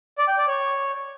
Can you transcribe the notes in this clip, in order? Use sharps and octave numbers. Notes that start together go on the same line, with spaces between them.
D5
G5
D5
C#5